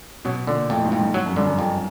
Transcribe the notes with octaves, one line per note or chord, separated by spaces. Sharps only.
B2 F#3
A#2 D3
F2 A2
G#2
F2
G2
F#3
F#2
G2 D3
F#2
F2